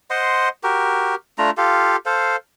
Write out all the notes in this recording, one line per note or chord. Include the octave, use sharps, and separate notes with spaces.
C5 D#5 F#5 C6
F#4 G4 A#4
A3 D4 F4 A#5
F4 G4 A4 F5
A4 C5 F5